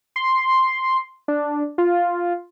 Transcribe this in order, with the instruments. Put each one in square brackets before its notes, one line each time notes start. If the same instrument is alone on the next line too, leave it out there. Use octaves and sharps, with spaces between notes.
[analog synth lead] C6
D4
F4